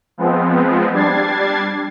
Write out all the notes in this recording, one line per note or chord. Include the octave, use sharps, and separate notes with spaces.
F3 G#3 B3 C4
G3 D4 G#6 A6 C7